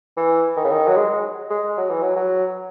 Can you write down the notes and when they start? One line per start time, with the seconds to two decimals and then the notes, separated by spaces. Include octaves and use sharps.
0.17 E3
0.57 D#3
0.64 C#3
0.71 D#3
0.88 F#3
0.96 G#3
1.50 G#3
1.77 F#3
1.90 E3
2.02 F#3
2.16 F#3